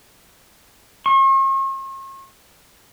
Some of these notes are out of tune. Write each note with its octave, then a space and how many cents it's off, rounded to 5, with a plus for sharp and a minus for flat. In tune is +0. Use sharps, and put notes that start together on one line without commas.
C#6 -45